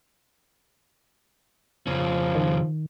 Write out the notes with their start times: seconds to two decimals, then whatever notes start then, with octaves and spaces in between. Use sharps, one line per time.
1.87 F2 C#3 F3 C#4
2.35 D#3